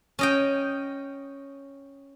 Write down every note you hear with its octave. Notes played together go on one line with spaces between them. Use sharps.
C#4 D#5 G5